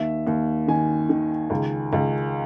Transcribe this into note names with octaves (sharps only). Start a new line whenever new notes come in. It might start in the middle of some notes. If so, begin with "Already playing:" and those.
Already playing: D#2 E5
D#2
D#3 G#5
D#3
C#2
C#2